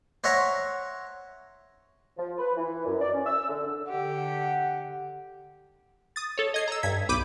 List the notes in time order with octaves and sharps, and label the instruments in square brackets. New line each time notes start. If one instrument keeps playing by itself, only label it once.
[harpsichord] C5 C#5 E5 F#5 A#5
[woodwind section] F3
B4
E3
F#2
D5
C#4
E6
D3
[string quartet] D3 G4 [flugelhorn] F#5
[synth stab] D#6 A6
A4 C#5
D#5 G#6 C7
A#5 E6
G2 G#6 B6
B1 B5 D6 G6 D#7